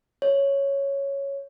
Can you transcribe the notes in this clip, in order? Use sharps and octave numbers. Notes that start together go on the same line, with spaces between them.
C#5